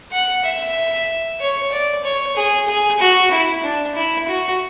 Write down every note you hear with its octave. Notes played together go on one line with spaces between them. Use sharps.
F#5
E5
C#5
D5
C#5
G#4
G#4
F#4
E4
D4
E4
F#4